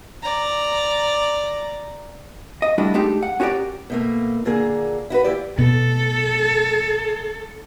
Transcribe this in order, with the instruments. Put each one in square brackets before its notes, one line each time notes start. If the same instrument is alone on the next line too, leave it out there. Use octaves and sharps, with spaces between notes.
[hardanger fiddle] D5 A#5
[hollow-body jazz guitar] D#5
G3 A3 D4 E4 F#4 A4
G#3 A3 D4 D#4 G4
F#5
C#4 F#4 G4 A#4 D5
[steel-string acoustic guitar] B2 A3 A#3
A#2 D3 A#3 G#4
E4 F#4 B4
D#2 E4 G4 D5
[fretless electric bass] B2 [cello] A4